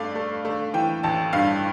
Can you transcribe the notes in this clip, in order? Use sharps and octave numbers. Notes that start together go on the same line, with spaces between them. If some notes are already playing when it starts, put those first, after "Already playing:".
Already playing: G2 A3 D5 F5
A3
A3
E3 G5
A1 A5
G2 F5